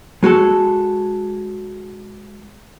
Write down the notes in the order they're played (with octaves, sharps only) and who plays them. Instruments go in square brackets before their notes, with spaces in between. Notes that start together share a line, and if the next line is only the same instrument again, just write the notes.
[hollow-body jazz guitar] G#3 F#4 G#4 A4